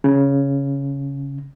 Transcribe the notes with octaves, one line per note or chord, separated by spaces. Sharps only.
C#3